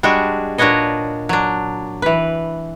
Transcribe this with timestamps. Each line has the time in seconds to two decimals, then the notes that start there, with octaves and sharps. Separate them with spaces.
0.03 G3 G#3 D4 F#4
0.58 A#2 D4 F#4 B4 C#5 D#5
1.29 F#3 D4
2.02 E3 B4